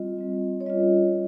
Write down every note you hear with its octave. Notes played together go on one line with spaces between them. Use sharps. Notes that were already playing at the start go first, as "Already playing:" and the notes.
Already playing: G3 C4 F4 D#5
G3 C4 F4
C#5
G3 C#4 F4 D#5